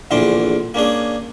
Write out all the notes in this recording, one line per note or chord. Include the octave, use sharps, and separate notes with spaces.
A#1 E2 D3 E3 C5 G5
A#3 C#4 D4 G#4